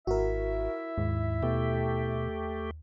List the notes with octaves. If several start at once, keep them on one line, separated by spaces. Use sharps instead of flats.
G#1 E4 F#4 A#4 E5
D#2 G#2
B2 A3 G4